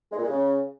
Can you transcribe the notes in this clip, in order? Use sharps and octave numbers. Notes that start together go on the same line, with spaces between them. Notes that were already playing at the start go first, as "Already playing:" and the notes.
G#3
A#2
G#3
C#3